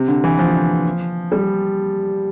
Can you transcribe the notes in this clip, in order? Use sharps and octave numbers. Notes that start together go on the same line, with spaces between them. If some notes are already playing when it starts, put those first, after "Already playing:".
Already playing: C3
D3
E3
F3
G3